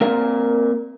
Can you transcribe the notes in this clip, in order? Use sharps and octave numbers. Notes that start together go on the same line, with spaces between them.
A#3 C4 A#4 D5 F5